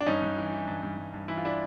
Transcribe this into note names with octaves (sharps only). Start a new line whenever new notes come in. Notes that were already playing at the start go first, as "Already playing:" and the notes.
D4
G2 C#4 D#4
G2
E3
E3
G2
G2
G2
G2
E3 E4
F4
D4 E4